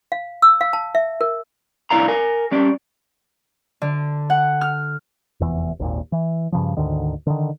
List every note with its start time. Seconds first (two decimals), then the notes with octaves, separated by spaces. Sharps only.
0.12 F5
0.42 E6
0.61 F5
0.73 A5
0.95 E5
1.21 A#4
1.90 C2 D4 E4 D5 F5 A#5
2.08 A#4 G#5
2.51 G3 C#4 D5
3.82 D3
4.30 F#5
4.61 F6
5.40 F1 E2 E3
5.80 G#1 D#2 A#2
6.12 E3
6.52 G2 C#3 F3
6.77 D2 G#2 D3 D#3
7.27 D3 D#3